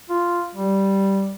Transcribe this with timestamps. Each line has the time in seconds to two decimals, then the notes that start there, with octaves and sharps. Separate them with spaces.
0.10 F4
0.55 G3